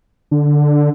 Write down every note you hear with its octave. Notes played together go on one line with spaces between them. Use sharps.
D3